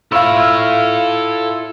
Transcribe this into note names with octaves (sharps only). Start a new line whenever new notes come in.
E4 F4 A4 C#5 F5 B5 E6